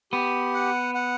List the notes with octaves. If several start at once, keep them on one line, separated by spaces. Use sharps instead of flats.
B3 G4
F#5
F#5